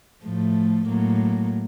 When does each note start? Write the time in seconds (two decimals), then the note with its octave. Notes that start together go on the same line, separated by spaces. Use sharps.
0.24 A2 F3 A3
0.86 A2 F#3 A#3